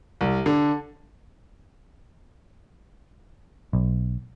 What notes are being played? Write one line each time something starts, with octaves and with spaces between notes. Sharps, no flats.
C2
D3
B1